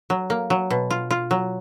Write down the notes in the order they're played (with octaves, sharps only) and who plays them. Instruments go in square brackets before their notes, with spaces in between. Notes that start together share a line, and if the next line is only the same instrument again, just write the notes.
[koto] F#3
A#3
F#3
B2
F4
F4
F#3